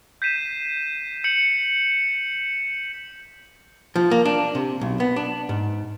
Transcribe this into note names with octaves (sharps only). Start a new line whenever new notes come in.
G6 B6 C7 D#7 E7
G6 C#7 F#7
F3
A#3
D4
C3
B1
B3
D4
G#2